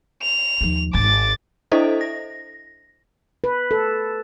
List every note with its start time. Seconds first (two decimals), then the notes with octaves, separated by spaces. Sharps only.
0.23 F7
0.61 D#2 F3
0.94 D#1 G#1 D6 A6
1.72 D4 E4 A4 C5 D#5 E5
2.01 A#6
3.44 B4
3.71 A4